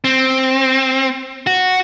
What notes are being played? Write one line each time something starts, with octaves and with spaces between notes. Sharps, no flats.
C4
F#4